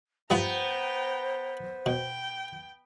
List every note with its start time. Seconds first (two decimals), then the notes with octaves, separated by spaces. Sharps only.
0.30 G2 F3 G3 B3 C5 G5 A#5
1.86 B2 G5